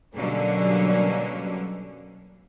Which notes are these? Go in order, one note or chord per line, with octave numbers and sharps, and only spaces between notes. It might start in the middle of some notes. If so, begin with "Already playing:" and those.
B2 D3 F#3 G3 A#3 C#4